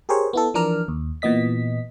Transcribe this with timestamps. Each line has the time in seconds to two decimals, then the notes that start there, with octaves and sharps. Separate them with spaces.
0.09 G4 G#4 A#4 C5 C#5
0.33 B3 E4 A4
0.54 E3 F3 D4 A#4 D5 F6
0.88 D#2
1.22 A#2 E3 B3 D#5 B6